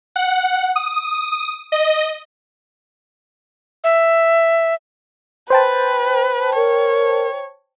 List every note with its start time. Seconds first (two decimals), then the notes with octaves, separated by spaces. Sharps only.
0.16 F#5
0.76 D#6
1.72 D#5
3.84 E5
5.50 B4 C5 G5 A5
6.56 A#4 C#5